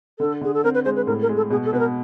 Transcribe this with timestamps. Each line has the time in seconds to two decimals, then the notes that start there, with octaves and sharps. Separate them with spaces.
0.19 D3 A4
0.41 D3 G#4
0.54 A4
0.64 C4 A#4
0.74 B4
0.85 G#3 C5
0.96 B4
1.07 A2 A#4
1.22 A#4
1.29 G#3
1.37 A4
1.50 B2 G#4
1.65 A4
1.73 B2 B4
1.79 A#4